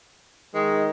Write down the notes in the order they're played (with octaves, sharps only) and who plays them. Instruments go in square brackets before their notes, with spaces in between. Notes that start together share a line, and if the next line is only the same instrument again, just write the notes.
[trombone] D#3 [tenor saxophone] G#3